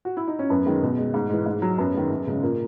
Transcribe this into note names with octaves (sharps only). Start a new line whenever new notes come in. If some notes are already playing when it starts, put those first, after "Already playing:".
F#4
E4
D#4
C#4
F#2 B3
D#3 G#3
B2
G#3
G#2
E3 G#3
G#2
F#3
F#2 B3
D#3 G#3
F#2
C#3 G#3
A#2 A#3